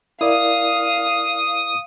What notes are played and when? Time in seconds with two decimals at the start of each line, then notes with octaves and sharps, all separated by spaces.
0.21 E4 A#4 D5 F5 D#6